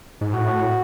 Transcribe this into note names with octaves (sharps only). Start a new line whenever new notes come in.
G#2
A2 F#4